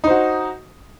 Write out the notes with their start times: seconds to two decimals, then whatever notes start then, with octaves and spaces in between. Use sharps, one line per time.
0.04 D#4
0.07 C5
0.10 F#4